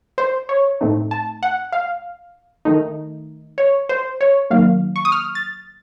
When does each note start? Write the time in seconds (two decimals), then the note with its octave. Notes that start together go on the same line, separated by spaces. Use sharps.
0.18 C5
0.49 C#5
0.81 A2 A3 C4 D#4
1.11 A5
1.43 F#5
1.72 F5
2.65 D#3 A3 D#4
3.58 C#5
3.89 C5
4.21 C#5
4.50 D#3 F#3 A#3 F5
4.96 C#6
5.05 D#6
5.12 F6
5.35 A6